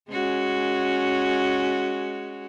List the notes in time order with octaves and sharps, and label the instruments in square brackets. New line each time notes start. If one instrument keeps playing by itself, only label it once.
[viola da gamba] G#3 C#4 F#4